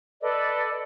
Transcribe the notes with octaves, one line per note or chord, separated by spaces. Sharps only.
A4 B4 D5 D#5